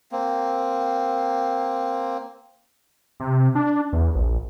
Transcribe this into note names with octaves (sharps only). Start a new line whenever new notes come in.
A#3 C4
C3
D4
E2
A#1